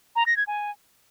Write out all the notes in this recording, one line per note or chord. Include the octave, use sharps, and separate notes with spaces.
A#5
A#6
G#6
G#5